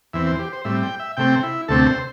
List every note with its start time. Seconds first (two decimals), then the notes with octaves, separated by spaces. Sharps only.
0.13 E2 E3 C4 E5
0.27 C5
0.39 G4
0.53 C5
0.65 A2 G3 C4 E5
0.83 G5
1.00 E5
1.17 C3 A3 C4 G5
1.43 E4
1.68 D2 C3 A3 C4 A4
1.86 C5